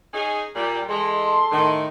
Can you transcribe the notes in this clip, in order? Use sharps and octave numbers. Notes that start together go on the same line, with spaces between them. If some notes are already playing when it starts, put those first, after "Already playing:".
C#4 D#4 G#4
A#2 G3
E3 G#3 A4 A5 C6
A2 D#3